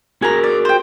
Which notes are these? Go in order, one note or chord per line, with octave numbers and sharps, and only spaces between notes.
F#4 G#4 A#4 G#5 A#5
D5
C5 G5